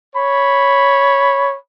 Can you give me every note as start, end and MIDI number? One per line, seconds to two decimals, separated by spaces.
0.16 1.55 73
0.16 1.55 83